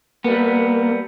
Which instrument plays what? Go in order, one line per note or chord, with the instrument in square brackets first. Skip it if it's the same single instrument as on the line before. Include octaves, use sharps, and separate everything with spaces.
[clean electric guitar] G3 B3 [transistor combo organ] A#3